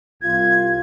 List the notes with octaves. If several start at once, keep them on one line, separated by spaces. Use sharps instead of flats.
C2 F4 G#6